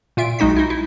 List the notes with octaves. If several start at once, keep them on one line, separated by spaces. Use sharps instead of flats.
A#2 F4 E5 D7
B1 G#3 D#4 F#4 B6
D#4 E4
E4